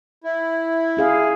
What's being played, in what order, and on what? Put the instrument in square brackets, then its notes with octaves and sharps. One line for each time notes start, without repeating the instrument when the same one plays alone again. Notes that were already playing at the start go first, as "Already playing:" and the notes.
[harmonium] E4
[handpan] C#4 G#4 F5